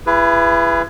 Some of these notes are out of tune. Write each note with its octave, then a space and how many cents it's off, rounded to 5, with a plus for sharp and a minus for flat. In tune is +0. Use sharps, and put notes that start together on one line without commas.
E4 +30 G#4 -25 B4 +0